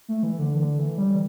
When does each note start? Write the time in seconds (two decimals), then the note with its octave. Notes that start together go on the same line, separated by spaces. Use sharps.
0.08 A3
0.23 E3
0.39 D3
0.58 D3
0.79 E3
0.98 G3